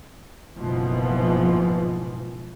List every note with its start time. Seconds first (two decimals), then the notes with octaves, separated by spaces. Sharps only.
0.58 F#1 G#2 B2 E3 F3